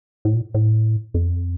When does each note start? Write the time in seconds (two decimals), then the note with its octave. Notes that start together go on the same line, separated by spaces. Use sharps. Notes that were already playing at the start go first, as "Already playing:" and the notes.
0.25 A2
0.34 A#2
0.54 A2
1.14 F2